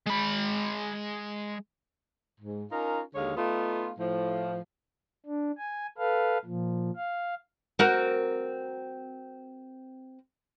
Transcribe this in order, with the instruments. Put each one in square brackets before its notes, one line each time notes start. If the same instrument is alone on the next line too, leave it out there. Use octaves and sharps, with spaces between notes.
[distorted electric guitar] G#3 B5
[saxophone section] G#2
C#4 D#4 F4 A#4
D#2 D3 G#3 C#5 F5
A3 B3 D#4 F4
A2 F3
[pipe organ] D4
G#5
A4 B4 F5
A#2 F3
F5
[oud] C4 F#4 A#4